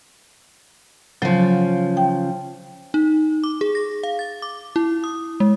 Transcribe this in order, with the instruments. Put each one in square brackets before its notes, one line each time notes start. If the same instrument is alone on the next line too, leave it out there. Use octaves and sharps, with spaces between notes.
[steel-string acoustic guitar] C#3 F3 [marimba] F#3
[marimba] G5
[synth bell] D#4
D6
G#4
A#6
F5
A6
D6
E4
D#6
G#3